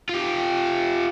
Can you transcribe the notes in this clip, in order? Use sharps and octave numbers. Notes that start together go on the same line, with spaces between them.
F4 G4